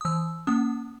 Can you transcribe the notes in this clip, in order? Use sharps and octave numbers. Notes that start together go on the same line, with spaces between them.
D#6
E3 E6
A#3 C#4 D#6